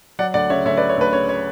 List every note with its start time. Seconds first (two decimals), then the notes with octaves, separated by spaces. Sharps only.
0.19 F#3 D5 F#5
0.34 D2 D5 F#5
0.50 C#3 C#5 E5
0.65 D2 C#5 E5
0.77 B4 D5
0.82 F#3
0.89 C#5
0.98 D2 B4
1.13 C#3 C#5
1.29 C#5